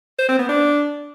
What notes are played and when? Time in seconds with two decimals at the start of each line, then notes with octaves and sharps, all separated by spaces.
0.19 C5
0.29 C4
0.39 B3
0.49 D4